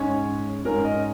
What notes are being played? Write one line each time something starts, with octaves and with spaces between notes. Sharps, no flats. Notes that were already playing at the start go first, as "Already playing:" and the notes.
Already playing: G#2 G#3 C#4 C#5
G#2 G#3 C#4 A#4
D#5